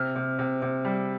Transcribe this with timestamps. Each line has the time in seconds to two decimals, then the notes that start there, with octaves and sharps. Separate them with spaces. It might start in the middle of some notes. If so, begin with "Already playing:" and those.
Already playing: C3 F6
0.16 C3
0.39 C3
0.62 C3
0.85 G3